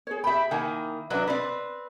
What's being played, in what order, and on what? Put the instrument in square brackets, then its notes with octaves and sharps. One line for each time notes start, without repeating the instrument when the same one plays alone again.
[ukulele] G#4 C#5
[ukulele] G4 B5 [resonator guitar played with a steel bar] E5 G5
[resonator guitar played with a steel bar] D#3 A#3 [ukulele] E4 E5 G#5
[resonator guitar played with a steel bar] F#3 D4 [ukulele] B4 D#5 E5
[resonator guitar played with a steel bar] C4 B4 [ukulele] D5